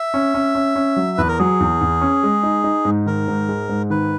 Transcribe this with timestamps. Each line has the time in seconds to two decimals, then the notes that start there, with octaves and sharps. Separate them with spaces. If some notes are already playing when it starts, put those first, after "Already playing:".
Already playing: E5
0.14 C#4
0.34 C#4
0.55 C#4
0.76 C#4
0.96 F#3
1.18 E2 B4
1.28 A#4
1.39 F#3 G#4
1.60 E2
1.81 E2
2.01 C#4
2.23 G#3
2.43 D#4
2.64 D#4
2.85 G#2
3.06 D#3 A#4
3.28 G#2
3.49 G#3
3.69 G#2
3.90 D#3 B4